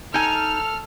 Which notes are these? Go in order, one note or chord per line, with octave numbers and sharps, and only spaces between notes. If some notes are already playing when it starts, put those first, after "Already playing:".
D#4 A4 G#5 F6